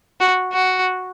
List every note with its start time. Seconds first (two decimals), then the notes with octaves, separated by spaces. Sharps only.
0.20 F#4
0.53 F#4